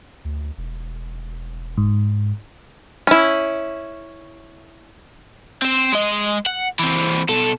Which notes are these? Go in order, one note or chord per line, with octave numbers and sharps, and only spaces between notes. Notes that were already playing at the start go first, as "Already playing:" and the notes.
D2
E1
G#2
C#4 E4
C4 C5
G#3 D#5
F#5
E3 C4
B2 A4